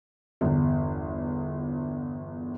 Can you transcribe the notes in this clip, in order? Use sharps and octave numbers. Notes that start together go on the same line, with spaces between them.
G1 E2